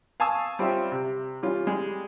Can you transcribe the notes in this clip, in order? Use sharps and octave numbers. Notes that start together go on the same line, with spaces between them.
F5 G#5 A5 C#6 D#6 E6
G3 C4 C#4 F4 G4 E5
C3
E3 G3 C#4 F4
G3 G#3